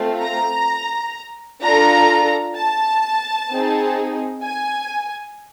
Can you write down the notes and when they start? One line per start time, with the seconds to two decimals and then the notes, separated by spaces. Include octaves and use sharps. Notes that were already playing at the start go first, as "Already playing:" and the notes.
Already playing: A3 C4 F4
0.20 A#5
1.62 D4 F4 A4 A#5
2.56 A5
3.51 C4 D#4 G#4
4.45 G#5